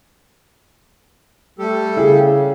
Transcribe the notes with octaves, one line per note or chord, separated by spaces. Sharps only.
G3 A3 G4 A4
C#3 E4 G#4